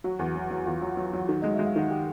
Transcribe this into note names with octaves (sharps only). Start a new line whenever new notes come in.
F#3 F#4 F#5
E2
F#3
F#3
E2 F4 F5
F#3
F#3
F#3
D#3 F#4 F#5
G#3 D#5
G#3 E5
F5
D#3 F#5
G4 G5